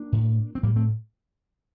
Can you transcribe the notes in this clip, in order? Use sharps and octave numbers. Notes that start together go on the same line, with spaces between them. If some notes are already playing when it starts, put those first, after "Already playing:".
Already playing: A#3 D4
A2
C4
A2 G3 A#3
A3 C4